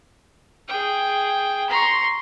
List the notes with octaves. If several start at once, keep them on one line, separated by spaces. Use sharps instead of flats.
G#4 G5
A#5 C6 C#6